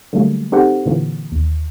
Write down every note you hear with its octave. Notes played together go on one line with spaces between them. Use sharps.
D3 F#3 G3 A3 A#3
C4 D#4 G4 A4 C5 F#5
A#2 D3 E3 A#3
D#2